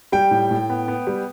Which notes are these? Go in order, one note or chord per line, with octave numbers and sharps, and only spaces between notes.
G3 G5
A2
A2
B3
B3
G3